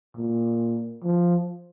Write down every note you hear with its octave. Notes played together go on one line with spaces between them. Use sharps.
A#2
F3